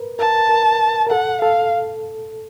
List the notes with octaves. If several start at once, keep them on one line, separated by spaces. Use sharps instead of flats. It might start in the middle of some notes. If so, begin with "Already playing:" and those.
Already playing: A#4 B4
A#4 A5
A#4
A#4
A4 F#5
A4 F5